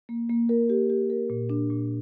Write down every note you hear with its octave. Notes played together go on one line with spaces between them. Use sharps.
A#3
A#3
A#4
G4
G4
A#4
A#2
D4
A#2